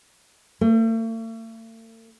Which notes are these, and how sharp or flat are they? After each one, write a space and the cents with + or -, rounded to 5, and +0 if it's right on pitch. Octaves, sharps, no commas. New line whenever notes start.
A3 +45